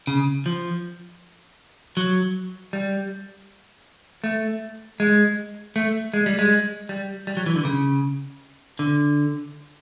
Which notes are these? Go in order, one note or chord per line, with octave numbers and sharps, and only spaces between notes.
C#3
F3
F#3
G3
A3
G#3
A3
G#3
G3
G#3
G3
G3
F#3
E3
D3
C#3
D3